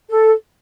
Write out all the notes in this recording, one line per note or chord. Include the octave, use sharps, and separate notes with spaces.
A4